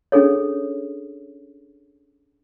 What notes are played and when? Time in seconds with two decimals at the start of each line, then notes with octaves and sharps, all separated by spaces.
0.12 C#4 D4 G#4 A4 C#5